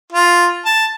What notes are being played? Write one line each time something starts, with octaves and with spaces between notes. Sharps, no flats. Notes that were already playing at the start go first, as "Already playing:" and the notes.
F4
A5